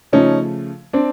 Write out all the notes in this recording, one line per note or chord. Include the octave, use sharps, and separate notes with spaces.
C#3 F3 A3 C#4 D#4
C4 D4